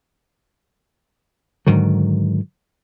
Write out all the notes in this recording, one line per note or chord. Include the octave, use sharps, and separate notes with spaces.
G#2 D3 D#3 F#3